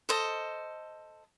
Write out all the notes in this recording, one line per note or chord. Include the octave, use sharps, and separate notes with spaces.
A4 C5 D#5